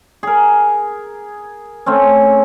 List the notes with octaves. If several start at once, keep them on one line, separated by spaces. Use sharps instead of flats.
G#4 A#4
A3 C4 C#4